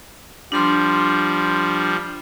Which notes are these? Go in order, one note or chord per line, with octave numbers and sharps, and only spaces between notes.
F3 G3 D4 C6